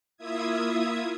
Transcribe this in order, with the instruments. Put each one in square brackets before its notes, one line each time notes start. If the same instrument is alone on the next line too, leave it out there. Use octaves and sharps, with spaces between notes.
[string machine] A#3 E4 F4 E5 D#6 G#6